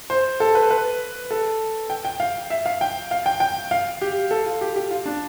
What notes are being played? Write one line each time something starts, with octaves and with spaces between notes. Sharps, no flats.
C5
A4
B4
B4
A4
G5
G5
F5
E5
F5
G5
F5
G5
G5
F5
G4
A4
F4
G4
G4
F4
D4